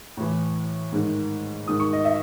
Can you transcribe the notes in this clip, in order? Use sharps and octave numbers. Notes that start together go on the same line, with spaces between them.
A2 E3
G#2 D#3
G#2 D#3 D#6
C#6
D#5
E5